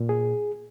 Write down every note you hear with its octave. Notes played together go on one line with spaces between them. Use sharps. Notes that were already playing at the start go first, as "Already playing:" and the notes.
Already playing: A#2
G#4